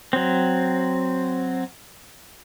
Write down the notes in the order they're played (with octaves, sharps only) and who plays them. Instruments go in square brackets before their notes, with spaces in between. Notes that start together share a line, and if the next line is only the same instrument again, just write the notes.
[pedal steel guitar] F#3 C4